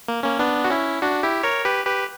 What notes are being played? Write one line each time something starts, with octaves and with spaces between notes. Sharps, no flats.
A#3
A#3 C#4
B3 D4
F#4
C#4 E4
D4 F#4
E4 G4
A#4 C#5
G4 B4
G4 B4